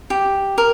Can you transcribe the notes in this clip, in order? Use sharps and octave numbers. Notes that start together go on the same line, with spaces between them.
G4
A#4